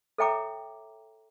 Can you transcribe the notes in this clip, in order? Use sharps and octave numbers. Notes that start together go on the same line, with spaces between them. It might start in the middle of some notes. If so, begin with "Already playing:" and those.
A4 C#5 E5 G5 A#5 D6